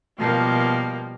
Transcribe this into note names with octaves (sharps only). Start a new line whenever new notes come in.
B2 F3 G3 A#3